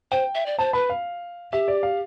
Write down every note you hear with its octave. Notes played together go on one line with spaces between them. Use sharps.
C5 G5
E5
D5
C5 A5
B4 B5
F5
G4 E5
D5
F5